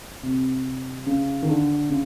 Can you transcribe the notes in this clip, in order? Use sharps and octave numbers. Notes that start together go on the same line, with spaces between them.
C3
C#3
D#3
D3
C#3